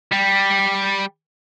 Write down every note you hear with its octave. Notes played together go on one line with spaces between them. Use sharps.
G3